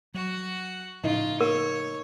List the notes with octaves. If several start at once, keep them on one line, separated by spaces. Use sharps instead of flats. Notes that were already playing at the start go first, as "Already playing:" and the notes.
F#3 F#4 F#5
A2 C#3 F3 D#4 F4
A#4 C#5